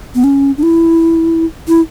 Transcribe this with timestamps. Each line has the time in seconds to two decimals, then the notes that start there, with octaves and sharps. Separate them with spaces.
0.15 B3
0.24 C#4
0.58 D4
0.63 E4
1.68 E4